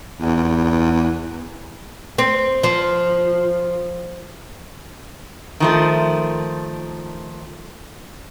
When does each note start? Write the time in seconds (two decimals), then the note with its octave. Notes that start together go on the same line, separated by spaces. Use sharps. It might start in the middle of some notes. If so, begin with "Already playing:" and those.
0.21 E2
2.18 C4
2.63 F3
5.60 D#3 F3 A3